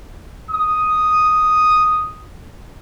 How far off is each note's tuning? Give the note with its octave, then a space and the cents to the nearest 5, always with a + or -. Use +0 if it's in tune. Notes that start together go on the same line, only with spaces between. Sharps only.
D#6 +0